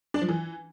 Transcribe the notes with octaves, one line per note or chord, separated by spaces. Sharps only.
D4
F3
E3